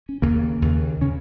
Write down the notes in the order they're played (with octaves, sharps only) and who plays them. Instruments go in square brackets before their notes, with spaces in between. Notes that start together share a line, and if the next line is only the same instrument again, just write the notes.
[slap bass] C#4
D#2 C#3 A#3
D#2 C#3
C#3 C#4